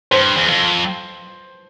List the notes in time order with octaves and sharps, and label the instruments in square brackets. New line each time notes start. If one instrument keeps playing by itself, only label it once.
[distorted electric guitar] G2 [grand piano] C5
[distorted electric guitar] E2
F2